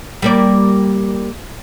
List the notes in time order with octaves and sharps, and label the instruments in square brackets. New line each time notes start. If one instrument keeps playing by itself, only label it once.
[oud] G3 A#3 D5